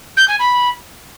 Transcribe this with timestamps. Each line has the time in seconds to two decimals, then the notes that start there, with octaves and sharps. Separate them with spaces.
0.17 G6
0.28 G#5
0.39 B5